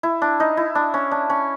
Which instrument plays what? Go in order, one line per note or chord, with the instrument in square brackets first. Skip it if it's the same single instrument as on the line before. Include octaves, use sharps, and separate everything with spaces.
[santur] E4
D4
D#4
E4
D4
C#4
D4
C#4